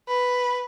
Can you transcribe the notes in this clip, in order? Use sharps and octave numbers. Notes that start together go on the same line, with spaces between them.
B4